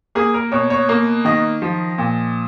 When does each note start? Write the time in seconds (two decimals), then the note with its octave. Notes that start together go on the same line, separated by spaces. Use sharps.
0.15 A#3 G#4
0.34 A#4
0.52 B2 C#5
0.70 C#5
0.89 A#3
1.25 D#3 D#5
1.62 F3
1.98 A#2